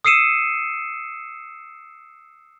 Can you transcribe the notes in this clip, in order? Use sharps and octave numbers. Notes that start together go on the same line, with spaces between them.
D#6 E6 C7 C#7 D#7 E7